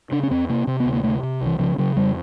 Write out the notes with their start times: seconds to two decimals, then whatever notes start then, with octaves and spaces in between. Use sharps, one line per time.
0.11 C#3 D4
0.23 C#4
0.30 E2 C4
0.49 C3 A#3
0.67 C3 C4
0.80 B3
0.85 D2
0.93 A#3
1.04 C3 A3
1.23 C3
1.41 C2
1.46 E3
1.59 C#3 F3
1.78 C#3 F#3
1.97 F2 G3